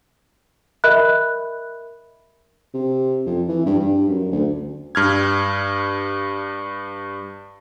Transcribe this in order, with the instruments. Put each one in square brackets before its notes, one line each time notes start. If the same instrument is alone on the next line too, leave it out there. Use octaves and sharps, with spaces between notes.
[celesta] A#4 D#5 E5 B5 F#6
[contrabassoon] C3
F2
E3
G2
G2
F#2
D2
[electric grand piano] G2 F6 G#6